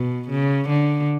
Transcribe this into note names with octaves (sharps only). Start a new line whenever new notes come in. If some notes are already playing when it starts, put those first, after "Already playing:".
Already playing: B2
C#3
D3